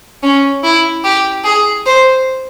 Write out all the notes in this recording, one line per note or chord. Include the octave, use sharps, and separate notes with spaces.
C#4
E4
G4
G#4
C5